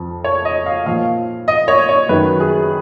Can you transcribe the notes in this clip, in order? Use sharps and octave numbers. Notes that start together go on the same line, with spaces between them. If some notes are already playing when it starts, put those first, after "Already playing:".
Already playing: F2 F3
C#5
D#5
F5
A#2 F3 F5
D#5
C#5
C#5
F#2 D#3 F#3 B4
G#4